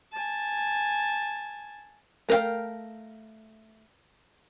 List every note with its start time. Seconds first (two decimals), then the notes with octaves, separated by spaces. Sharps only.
0.13 G#5 A5
2.29 A3 A#4 B4 F5 G5